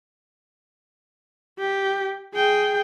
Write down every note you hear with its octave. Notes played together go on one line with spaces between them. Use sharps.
G4
G#4 G5